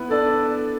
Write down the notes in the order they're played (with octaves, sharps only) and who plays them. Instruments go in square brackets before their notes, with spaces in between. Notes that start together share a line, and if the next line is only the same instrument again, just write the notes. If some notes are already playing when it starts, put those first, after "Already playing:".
Already playing: [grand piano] B3 E4 B4
[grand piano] D4 D5 [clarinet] A4